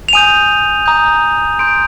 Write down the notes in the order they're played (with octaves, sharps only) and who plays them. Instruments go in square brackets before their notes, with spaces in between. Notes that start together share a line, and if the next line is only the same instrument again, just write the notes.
[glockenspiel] F7
G#5 D#6 G6 D#7
A#5 D#6 G6
C6 G6 D7